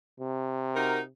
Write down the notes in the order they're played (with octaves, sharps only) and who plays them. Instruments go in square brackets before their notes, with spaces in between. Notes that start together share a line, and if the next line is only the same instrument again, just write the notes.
[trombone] C3
[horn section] D#4 F#4 A#4